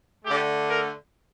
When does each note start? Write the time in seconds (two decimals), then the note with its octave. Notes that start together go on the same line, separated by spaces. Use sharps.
0.25 D3 A3 G4
0.67 A#4